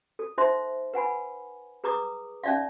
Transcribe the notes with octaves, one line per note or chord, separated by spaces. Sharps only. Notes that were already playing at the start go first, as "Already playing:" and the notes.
A4
D#4 C5 E5 C6
B4 F#5 G#5 B5
G#4 B4 A#5 D6 D#6
C#4 D#4 D5 E5 F5